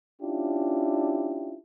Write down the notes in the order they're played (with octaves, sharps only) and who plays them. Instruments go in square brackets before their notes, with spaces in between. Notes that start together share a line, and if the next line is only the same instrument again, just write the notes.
[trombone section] C#4 D4 E4 F4 G4